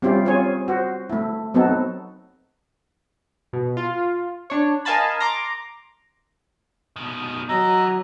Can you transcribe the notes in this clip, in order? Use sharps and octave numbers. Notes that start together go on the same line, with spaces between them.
G3 C4 C#4 E4 F4 G4
C4 C#4 F4 G#4 C#5
F#4 C5
A3 E4
F#3 B3 C4 D#4 A4
B2
F4
D4 C#5
A#4 D#5 F5 G#5 A5 B5
A#5 C6 D6
B2 D#3
E3 F#3 D#5 A#5